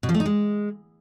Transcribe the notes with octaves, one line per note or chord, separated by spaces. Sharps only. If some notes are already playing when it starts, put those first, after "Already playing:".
B2
F3
A3
D#4
G#3